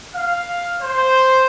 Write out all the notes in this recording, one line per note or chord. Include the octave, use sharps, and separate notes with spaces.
F5
C5